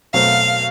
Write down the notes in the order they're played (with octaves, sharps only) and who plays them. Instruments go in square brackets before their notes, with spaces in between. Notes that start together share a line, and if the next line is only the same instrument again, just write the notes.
[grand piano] B2 F#3 A3 C4 [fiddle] F5